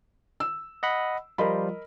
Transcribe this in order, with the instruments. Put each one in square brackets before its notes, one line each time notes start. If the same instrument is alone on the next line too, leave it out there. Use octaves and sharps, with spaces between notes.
[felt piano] E6
[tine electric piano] D#5 F#5 B5
[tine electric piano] F3 G3 F4 [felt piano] A#4 D#5 B5